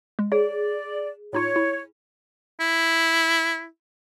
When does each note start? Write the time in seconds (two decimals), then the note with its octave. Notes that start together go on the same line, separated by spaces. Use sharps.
0.19 G#3
0.32 G#4 C#5 D5
1.33 A2 D#4 F4 C#5
1.56 E4
2.61 E4